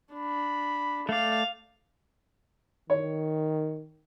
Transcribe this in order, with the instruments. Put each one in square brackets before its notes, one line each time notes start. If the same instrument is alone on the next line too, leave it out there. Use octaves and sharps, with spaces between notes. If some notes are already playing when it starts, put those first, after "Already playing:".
[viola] D4 [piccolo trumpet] B5
[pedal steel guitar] A3 D5 [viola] F5
[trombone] D#3 [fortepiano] C#5